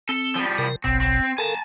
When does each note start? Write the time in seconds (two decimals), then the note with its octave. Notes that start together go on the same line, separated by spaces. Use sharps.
0.09 C4 A4
0.35 F3 G3
0.58 C3 A#4
0.84 F#1 B1 B2 C4
1.00 C4
1.38 A4 A#4 F5 G#5 A5